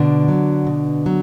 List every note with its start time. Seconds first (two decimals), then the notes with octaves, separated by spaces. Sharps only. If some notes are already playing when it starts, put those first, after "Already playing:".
Already playing: B2 D3 D4
0.29 F#3
0.67 B2
1.06 F#3